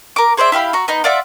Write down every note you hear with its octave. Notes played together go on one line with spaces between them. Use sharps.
A#4 D6
G#4 C5 D5 E5
E4 G4 F5 B5
F#4 A#5
B3 D#4
F4 D5 E5 F#5